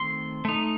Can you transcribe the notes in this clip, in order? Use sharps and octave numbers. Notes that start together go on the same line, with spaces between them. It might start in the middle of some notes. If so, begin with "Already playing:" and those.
Already playing: D#3 A3 C4 C6
A3 D#4